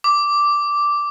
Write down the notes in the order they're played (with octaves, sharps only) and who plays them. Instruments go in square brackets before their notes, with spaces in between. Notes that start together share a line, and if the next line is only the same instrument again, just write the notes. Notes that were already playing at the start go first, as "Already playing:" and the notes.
[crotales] D6